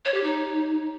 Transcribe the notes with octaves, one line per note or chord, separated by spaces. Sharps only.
C#5
G4
D#4